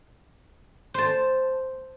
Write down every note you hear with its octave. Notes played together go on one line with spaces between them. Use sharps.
C5 A5